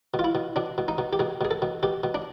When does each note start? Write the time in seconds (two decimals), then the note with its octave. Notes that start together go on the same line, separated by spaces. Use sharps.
0.14 B2
0.19 F4
0.24 E4
0.35 B2
0.56 B2 D4
0.78 B2
0.88 D#4
0.98 B2
1.13 G4
1.19 B2 G#4
1.41 B2 G#4
1.51 A4
1.62 B2
1.83 B2 G4
2.03 B2
2.14 D4